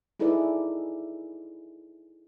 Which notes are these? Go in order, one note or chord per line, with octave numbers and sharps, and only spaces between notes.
D#4 E4 G#4 A4 B4 D5